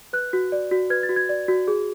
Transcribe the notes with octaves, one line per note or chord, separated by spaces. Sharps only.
B4 F#6
F#4
D5
F#4
B4 G#6
A6
F#4
G#6
D5
F#4
G#4